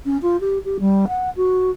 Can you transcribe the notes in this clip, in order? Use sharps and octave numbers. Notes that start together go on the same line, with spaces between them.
C#4
F4
G4
G4
G3
F#5
F#4